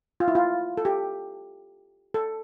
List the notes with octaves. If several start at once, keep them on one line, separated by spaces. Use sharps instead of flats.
F4
E4
F4
A4
G4
A4